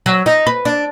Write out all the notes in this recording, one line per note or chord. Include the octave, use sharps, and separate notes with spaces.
F#3
D#4
B4
D4